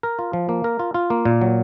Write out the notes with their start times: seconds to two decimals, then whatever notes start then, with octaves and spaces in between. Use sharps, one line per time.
0.03 A#4
0.19 F4
0.33 F3
0.49 A#3
0.64 A#4
0.79 F4
0.94 F4
1.10 A#3
1.25 A#2
1.42 F#3